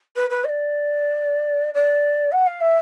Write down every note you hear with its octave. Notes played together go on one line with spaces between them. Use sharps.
B4
B4
D#5
D5
D5
F#5
F5
E5